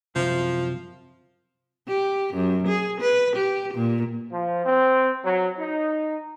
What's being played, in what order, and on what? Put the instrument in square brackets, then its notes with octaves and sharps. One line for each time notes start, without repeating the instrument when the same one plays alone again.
[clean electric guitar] C2 F#2 C3 [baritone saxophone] F3
[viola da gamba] G4
F#2
G#4
B4
G4
A#2
[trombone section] F3
C4
F#3
D#4